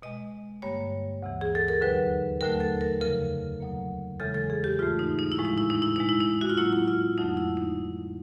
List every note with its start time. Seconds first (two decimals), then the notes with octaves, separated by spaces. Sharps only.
0.02 B2 G#3 D#5
0.62 G2 D3 G3 A#3 C#5
1.23 D2 C3 E3
1.41 G#4
1.55 A4
1.68 A#4
1.82 D#2 D3 F#3 B4
2.41 D#2 D3 F#3 A3 A#4
2.60 A4
2.81 A#4
3.01 F2 C#3 F3 A#4
3.60 B2 F#3 A#3
4.20 E2 C#3 E3 G#3 A4
4.35 A4
4.50 G#4
4.64 G4
4.79 G#2 E3 A3 F4
4.99 D#4
5.19 D#4
5.32 E4
5.38 A2 F3 G#3
5.45 D#4
5.58 E4
5.70 D#4
5.82 E4
5.96 B2 G#3 D#4
6.09 E4
6.20 D#4
6.41 F#4
6.50 F4
6.57 A2 F#3 A#3 E4
6.73 E4
6.88 F4
7.18 F2 D3 F#3 A3 D#4
7.37 E4
7.57 D#4